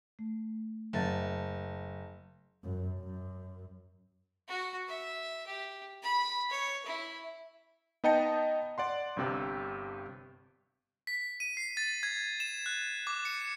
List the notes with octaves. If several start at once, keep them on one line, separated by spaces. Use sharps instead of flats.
A3
F#1 F#3 E5 A6
F#2
F#2
F#4
E5
G4
B5
C#5
E4
B3 D#4 D#5 G5 A5 C#7
D5 F#5 C6
G1 G2 C3 G4
B6
D#7
C7
A6
G#6
E7
F#6
D6
C#7